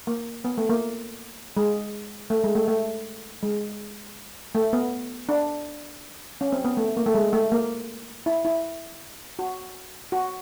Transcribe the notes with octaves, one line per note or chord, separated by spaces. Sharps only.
A#3
B3
A3
A#3
G#3
A3
G#3
A3
A3
G#3
A3
B3
D4
C#4
C4
B3
A3
A#3
A3
G#3
A3
A#3
E4
E4
F#4
F#4